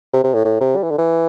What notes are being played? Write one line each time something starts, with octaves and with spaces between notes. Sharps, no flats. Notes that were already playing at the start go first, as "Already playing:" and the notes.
C3
C3
A2
A2
C3
G3
E3
D3
E3